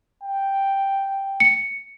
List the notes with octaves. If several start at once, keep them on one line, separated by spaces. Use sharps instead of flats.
G5
C#7